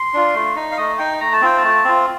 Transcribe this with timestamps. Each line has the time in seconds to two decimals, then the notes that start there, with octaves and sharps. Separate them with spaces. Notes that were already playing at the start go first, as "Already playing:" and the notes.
Already playing: C6
0.13 D4 F4
0.34 A3
0.56 D#4
0.72 F5
0.77 A3 D#5
0.98 D#4 G5
1.20 A3 A#5
1.33 A5
1.41 C4 F4 G5
1.58 A5
1.63 A3
1.84 C4 F4